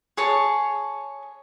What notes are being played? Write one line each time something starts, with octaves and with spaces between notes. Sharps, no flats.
G#4 C#5 A5